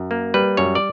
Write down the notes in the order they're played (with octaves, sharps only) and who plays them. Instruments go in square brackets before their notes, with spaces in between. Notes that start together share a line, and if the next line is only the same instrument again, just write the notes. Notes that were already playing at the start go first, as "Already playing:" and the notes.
Already playing: [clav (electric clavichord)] F#2
A#3
G3 B4
F#2 C#5
D5